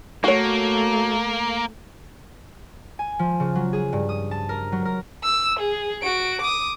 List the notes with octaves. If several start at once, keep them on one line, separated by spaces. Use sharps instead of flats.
A3 A#3 F#4 C#5
G#5
F3
C#3
F#3
G#4
G2
D#6
A5
A#4
F#3
A#4
E6
G#4
F#4 D7
D6 D#6